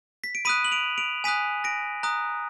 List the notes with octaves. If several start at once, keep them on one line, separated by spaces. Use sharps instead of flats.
B6
D7
B5 D#6 F#6 B6 D#7
F#7
D7 F7
D7 F7
G#5 D#6 F#6 B6 D#7
A#6 D7
A#5 D#6 F#6